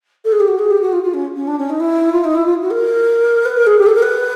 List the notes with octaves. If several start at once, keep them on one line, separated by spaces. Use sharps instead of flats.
A4
G#4
G4
F#4
G#4
G4
F#4
F4
F4
C#4
C#4
D4
C#4
D#4
E4
F4
D#4
E4
F4
F#4
A#4
B4
A#4
G#4
G4
A4
A#4
B4